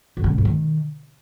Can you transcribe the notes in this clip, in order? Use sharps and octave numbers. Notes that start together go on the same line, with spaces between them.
F#2
C#3
B2
G#2
D#3